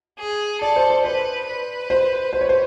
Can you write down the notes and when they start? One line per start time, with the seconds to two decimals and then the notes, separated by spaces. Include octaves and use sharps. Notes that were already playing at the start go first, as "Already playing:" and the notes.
0.19 G#4
0.62 A4 D5
0.76 C5
0.90 C5
1.04 B4 C5
1.47 B4
1.90 C5
2.33 C5
2.41 C#5
2.49 C5